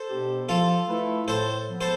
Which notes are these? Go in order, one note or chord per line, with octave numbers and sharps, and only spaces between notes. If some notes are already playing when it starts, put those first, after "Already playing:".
Already playing: A4 C5
B2 B3 D4 G4
F3 F4 A4
A3 E4 B4
A2 A4 C5
F3 B3
A4 C5